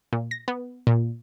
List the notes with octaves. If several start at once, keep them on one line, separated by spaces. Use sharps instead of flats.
A#2
A#6
B3
A#2